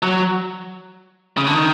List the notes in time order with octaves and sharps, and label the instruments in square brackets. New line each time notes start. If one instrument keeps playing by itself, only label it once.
[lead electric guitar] F#3
C#3
D3
D#3